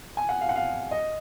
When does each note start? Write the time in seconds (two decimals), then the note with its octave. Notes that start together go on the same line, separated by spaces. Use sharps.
0.17 G#5
0.29 F#5
0.41 F5
0.49 F#5
0.56 F5
0.91 D#5